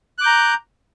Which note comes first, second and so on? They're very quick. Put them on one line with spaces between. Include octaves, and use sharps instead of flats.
F#6 D6 G6 A#5